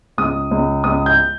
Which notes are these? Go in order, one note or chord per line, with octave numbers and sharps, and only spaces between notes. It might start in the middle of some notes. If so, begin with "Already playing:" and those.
C#2 D#6
C#2
C#2 D#6
G6